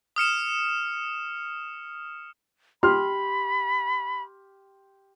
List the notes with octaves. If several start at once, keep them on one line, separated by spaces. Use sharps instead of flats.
D#6 F6 C#7 E7
G4 B5 C6 F6